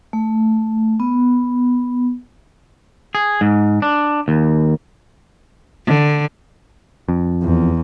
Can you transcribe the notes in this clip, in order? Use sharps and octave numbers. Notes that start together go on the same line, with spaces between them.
A3
B3
G#4
G#2
D4
D#2
D3
F2
E2